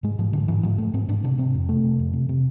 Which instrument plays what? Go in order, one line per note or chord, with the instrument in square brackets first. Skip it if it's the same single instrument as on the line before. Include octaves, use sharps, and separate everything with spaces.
[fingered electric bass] G#2 G#3
G#2 F3
G#2 D3
G#2 E3
G#2 F3
G#2 A3
G#2 C4
G#2 D4
C3 D4
C3 C4
F2
C3 A3
C3
F2
C3
C3